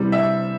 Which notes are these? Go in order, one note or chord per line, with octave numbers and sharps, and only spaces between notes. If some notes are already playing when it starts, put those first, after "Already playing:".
Already playing: C3 E3 G3
E5